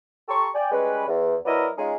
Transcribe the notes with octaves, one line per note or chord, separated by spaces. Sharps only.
G4 A4 A#5 C6 C#6
D5 G5 G#5
G3 G#3 C#4 B4
E2
F#3 B3 E4 A#4 D5 D#5
G#3 C#4 D#4 F4 G#4